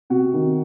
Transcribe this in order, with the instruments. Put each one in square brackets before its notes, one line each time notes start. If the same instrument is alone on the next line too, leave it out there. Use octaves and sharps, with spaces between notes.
[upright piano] C3 F#4
D#3